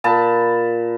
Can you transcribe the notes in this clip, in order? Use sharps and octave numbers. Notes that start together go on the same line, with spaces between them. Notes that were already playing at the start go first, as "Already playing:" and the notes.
A#2 A5 B5